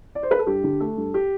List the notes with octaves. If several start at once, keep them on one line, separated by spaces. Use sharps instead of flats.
D5
C5
B4
A4
G2 G4
D3
A3 A4
G2
G4